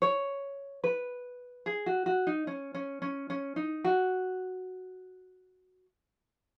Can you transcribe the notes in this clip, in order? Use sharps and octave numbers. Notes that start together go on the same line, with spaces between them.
C#5
B4
G#4
F#4
F#4
D#4
C#4
C#4
C#4
C#4
D#4
F#4